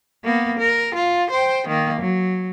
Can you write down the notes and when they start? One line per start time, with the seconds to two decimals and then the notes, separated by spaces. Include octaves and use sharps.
0.24 A#3 B3
0.59 A#4
0.95 F4
1.31 C5 G5
1.67 D#3 A#3
2.01 F#3